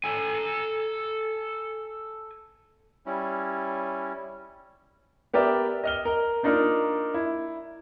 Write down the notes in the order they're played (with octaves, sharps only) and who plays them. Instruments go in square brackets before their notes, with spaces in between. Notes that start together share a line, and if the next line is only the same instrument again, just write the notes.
[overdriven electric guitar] A4 G#5
[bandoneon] G3 C#4 E4
[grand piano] B3 G4 A#4 D5 E5
D#5 F6 G7
A#4
A#3 D4 D#4 F4 A#4
E4